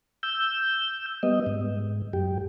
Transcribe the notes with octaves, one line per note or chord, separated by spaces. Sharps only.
E6 G6
G3 B3 D#5
G#2
F#2 G4